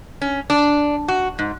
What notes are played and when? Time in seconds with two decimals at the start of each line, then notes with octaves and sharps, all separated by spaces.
0.22 C#4
0.50 D4
1.08 F#4
1.39 G#2